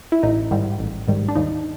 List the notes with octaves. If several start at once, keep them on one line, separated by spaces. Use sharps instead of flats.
E4
A1 D#4
G#2 D#3 G3
A1
G#2 D#3 G3
D4
D#2 D#4